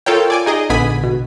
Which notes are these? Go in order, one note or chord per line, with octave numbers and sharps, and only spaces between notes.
F4 A4 A#4 C#5 G5
D5 G#5 D6
D#4 G#4 D#5
A#1 D3 B3 G#5 B5 D#6
B2